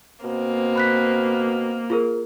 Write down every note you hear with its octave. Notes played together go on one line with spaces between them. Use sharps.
B2 A#3 C4
B5 F#6 B6
F4 G#4 A#4